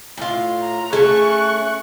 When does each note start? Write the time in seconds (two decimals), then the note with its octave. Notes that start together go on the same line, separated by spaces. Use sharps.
0.17 A2 F4
0.62 A#5
0.93 A3 C4 C#4 G#4 C#6 F#6